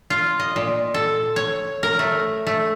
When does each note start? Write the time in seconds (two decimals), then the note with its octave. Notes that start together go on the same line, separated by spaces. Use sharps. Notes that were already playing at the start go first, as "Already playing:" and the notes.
0.10 F4
0.39 D#5
0.56 A#2
0.94 A4
1.36 C#5
1.83 A#4
1.99 A3
2.47 A3